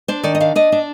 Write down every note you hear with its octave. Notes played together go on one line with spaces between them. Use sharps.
D4 C5
D#3 D5
D#5
D4 F5
D4 D#5
D4